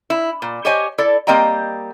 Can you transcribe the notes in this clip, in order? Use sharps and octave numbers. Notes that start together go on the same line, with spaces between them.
E4
A#2
G4 C5 C#5 D#5 G#5
E4 A4 D5
G3 A#3 C4 D#5 G5 A#5